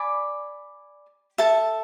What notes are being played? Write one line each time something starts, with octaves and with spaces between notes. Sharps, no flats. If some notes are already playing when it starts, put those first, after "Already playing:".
Already playing: D5 G#5 B5 D6
A4 E5 A5